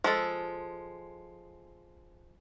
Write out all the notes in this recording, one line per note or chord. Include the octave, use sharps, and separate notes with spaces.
F3 G#3 A4